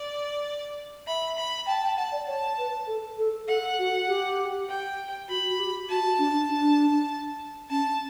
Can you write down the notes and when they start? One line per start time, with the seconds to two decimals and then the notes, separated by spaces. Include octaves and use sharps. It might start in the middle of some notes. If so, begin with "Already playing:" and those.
Already playing: D5
1.07 E5 B5
1.38 B5
1.67 G5 A5
1.82 G5
1.97 F#5 A5
2.12 D5
2.27 C#5 A5
2.58 B4
2.87 A4
3.18 A4
3.48 A4 F#5
3.79 F#4
4.08 G4
4.69 G5
5.29 F#4 B5
5.50 F#4
5.60 G4
5.89 F#4 A5
6.19 D4
6.50 D4
7.70 C#4 A5